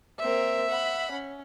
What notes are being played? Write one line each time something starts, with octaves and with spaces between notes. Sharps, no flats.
A#3 C4 A#4 E5
F#5 B5
C#4